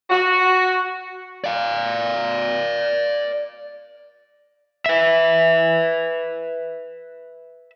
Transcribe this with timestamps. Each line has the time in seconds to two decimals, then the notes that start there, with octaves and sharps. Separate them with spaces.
0.10 F#4
1.44 D5 F5
4.86 B4 E5